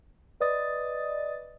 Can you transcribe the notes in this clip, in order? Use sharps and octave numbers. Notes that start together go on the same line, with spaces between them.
B4 D5 D#5 D#6 A6